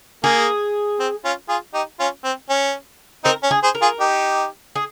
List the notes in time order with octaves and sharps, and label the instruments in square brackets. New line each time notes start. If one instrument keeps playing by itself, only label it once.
[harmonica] A#3 [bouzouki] G#4
[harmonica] C4
C#4 F4
F4 G#4
D#4 G4
C#4 F4
C4
C#4
[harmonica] C4 D#4 [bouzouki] A#4
[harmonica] C#4
[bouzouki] G#4
[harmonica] G#4 C5
[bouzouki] A#4
[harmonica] F4 G#4
D#4 G4
[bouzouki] G#4